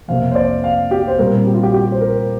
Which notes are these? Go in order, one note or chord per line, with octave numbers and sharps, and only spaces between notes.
F2 C3 A#3 F5
C5
D5
F5
G4
C5
A#2 G3 C4 A#4
G4
F4
G4
G4
C5
A#4